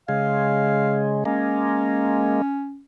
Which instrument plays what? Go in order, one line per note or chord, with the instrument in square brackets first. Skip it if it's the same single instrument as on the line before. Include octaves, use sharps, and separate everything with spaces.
[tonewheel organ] C#3 G#3 [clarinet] F5
[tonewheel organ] G#3 A#3 [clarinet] C#4